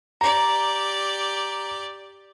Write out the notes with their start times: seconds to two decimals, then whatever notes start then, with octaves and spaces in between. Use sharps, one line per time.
0.21 G4 D5 A#5